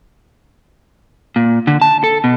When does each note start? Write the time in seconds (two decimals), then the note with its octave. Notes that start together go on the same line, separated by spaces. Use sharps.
1.36 A#2
1.67 D3
1.82 A5
2.04 A4
2.24 B2